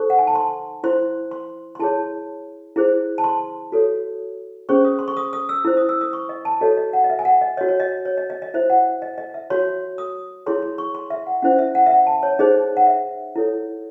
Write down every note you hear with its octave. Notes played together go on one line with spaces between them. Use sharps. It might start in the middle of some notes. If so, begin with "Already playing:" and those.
Already playing: D#4 A4 C5 C#6
F#5
G#5
A5
C6
E4 C5 C6
C6
C6
E4 G#4 C#5 A5
E4 G#4 C5
A5
C6
F#4 A4 C#5
C#4 G#4 C5 C#6
D#6
C6
C#6
D#6
D#6
E6
E4 C5
D#6
E6
D#6
C#6
D#5
A5
F#4 A4 C#5 D#5
D#5
F#5
D#5
E5
G#5
F#5
D#5
F#4 C#5 D#5
C#5
D#5
C#5
D#5
D#5
D#5
E4 C5 E5
F#5
D#5
D#5
E5
F#4 C#5 C6
D#6
E4 G#4 C#5 C6
C6
C#6
C6
E5
F#5
C#4 E4 C5 F#5
E5
F#5
E5
F#5
A5
C#5
D#4 G#4 C5 D#5
F#5
E5
E4 A4 C#5